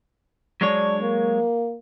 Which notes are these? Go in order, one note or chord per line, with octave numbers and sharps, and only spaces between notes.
F#3 G#3 D4 C#5
A#3